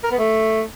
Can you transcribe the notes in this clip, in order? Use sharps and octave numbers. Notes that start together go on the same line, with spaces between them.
A#4
B3
A3